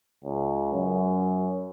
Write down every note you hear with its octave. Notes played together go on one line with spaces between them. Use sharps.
C#2
F#2